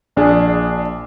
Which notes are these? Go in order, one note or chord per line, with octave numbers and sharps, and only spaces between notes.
A#1 D4 G#4